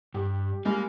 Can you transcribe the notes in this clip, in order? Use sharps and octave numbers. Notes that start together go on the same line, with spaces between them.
G2 G4
G3 G#3 A#3